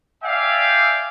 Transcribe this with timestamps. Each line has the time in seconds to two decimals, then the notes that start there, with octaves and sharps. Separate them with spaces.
0.23 D5 E5 F5 G5 G#5